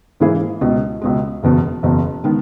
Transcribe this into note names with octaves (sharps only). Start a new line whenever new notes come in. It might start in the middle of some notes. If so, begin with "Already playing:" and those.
G#2 E3 A#3 E4 G#4
C#2 B2 G#3
C#2 B2 G#3
F#1 E2 B2
F#1 E2 B2
D#3 G#3 B3